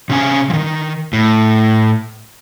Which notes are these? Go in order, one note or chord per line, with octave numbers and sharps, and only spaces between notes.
C3 C#4 G#5
D#3 F3
A2